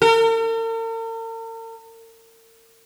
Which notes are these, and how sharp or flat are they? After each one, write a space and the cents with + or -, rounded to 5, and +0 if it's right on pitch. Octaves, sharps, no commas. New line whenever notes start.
A#4 -45